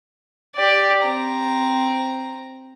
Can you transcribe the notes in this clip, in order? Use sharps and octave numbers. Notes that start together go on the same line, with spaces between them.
G4 D5
C4 A#5